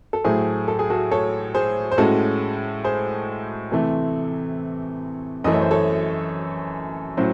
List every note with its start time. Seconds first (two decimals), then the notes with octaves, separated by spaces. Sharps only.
0.13 A4
0.24 A2 F#3 A3 G#4 C5
0.68 A4
0.79 G#4
0.90 F#4 A4
1.12 A4 C#5
1.55 G#4 C5
1.91 C5
1.98 A2 G#3 C#4 F#4 A4
2.84 G#4 C5
3.71 C3 E3 A3
5.44 F#2 E3 A3 D#5
5.53 C#5
5.62 C5
5.71 A4 C#5
7.17 A2 F#3 C#4 C5